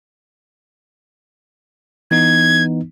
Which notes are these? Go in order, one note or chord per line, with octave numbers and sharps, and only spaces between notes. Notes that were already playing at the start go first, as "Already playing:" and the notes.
E3 B3 D#4 G#6